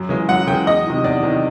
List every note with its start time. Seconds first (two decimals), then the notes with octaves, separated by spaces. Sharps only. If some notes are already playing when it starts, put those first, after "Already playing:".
Already playing: F#2
0.09 C#3 E3 G#3
0.29 F#2 F#5
0.47 C#3 E3 G#3 G5
0.66 E2 D#5
0.86 C3 D#3
1.04 E2 D5
1.23 C3 D#3